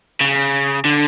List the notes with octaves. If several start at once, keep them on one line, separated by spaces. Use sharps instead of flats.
C#3
D3